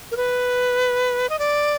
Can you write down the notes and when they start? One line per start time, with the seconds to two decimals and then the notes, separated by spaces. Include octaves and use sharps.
0.11 A#4
0.17 B4
1.30 D#5
1.39 D5